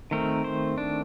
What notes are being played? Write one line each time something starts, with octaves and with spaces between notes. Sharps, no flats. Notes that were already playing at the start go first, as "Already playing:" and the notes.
D#3 A3 C4 A#4
C5
D4